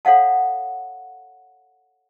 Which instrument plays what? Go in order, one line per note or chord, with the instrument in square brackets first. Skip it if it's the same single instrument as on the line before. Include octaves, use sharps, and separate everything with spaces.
[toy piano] A4 C#5 F5 F#5 A5